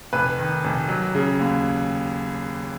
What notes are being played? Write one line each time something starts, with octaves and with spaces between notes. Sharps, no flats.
F1 B4
D#3
F1
F#3
C#3
D#2